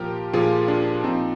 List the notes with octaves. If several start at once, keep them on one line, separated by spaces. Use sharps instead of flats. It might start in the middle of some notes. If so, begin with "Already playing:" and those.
Already playing: A#2 F3 G4 A#4
A#2 F3 F4 G#4
D4 F4
A#2 F3 C4 D#4